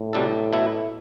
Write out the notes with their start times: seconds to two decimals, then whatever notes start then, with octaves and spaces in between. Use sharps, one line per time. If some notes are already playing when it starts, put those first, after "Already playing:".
Already playing: A2
0.13 C2 B2 G3 D4 A4
0.53 B2 A3 E4